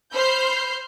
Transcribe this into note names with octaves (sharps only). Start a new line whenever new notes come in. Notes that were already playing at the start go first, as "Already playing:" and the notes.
C5 B5 F6 G6 C7